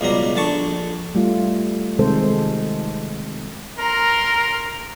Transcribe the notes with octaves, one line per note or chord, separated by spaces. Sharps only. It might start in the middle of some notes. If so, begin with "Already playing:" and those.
C#2 B2 G3 A#5
A#1 D3 A5 C#6
G3 A3 F4
C3 D#3 G#3 A4 C5
A#4 A#5 C6